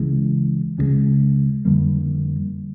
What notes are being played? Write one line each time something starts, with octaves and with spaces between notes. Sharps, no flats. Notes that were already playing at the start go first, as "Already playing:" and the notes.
Already playing: C#2 C#3 E3 G#3
C#2 C#3 E3 G#3
F2 D3 G3 A#3